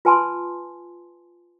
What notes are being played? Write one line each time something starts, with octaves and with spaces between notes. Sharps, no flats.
F4 B4 G#5 A5 C6